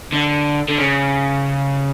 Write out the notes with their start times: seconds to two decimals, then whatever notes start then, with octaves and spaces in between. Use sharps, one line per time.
0.14 D3
0.69 D3
0.78 C#3